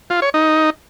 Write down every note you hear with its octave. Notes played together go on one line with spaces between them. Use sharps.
F4
C#5
D#4